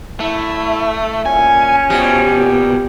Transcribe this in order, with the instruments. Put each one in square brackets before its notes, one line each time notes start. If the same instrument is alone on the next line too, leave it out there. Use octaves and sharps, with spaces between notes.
[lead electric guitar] A3 [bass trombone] E4
[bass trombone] A#2 [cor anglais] C#4 [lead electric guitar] G#5
[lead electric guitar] B2 [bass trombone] F3 [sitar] G3
[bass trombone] A#2